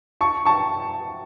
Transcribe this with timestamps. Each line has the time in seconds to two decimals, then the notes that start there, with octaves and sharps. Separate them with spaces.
0.21 A5 C#6
0.45 A5 C#6